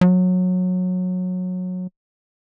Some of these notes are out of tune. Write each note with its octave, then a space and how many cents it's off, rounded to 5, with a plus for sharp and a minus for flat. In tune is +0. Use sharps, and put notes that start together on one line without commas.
F#3 -20